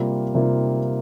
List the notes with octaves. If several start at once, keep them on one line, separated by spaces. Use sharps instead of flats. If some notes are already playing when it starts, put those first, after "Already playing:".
Already playing: C3 G3 A#3 F4
C3 G3 A#3 F4